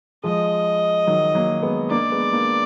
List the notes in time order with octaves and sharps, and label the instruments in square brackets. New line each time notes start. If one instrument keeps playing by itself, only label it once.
[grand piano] F3 G#3 [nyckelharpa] D#5
[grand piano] D#3 F#3
F#3 A#3
G#3 B3
[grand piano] A#3 D4 [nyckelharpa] D5
[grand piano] G#3 B3
A#3 D4